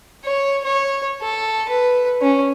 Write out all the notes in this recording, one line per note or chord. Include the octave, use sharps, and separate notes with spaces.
C#5
C#5
A4
B4
C#4